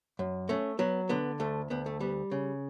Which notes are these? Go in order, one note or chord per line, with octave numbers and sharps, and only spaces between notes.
F#2
A3 C#4
F#3 B3
D3 B3
D2 A3
D2 B3
A3
G3 B3
C#3